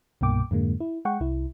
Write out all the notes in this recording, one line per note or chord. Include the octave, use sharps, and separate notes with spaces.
C2 G2 B2 A#3 G5 D6
F2 G#2 D3 G#3 A#3
E4
G#3 F#5 G5 C#6
C2 E4